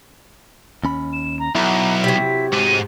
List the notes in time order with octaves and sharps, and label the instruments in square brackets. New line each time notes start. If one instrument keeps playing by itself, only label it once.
[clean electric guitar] D#2 C#4 B5
[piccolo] E7
A#5
[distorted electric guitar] B1 [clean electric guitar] E4 [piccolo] A#5
[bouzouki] C3 F#3 [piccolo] B6
[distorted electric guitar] G#2 [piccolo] D#7